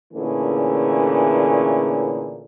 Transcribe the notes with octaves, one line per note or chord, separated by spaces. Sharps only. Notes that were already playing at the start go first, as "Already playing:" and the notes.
A#2 D3 E3 A3 C#4 G#4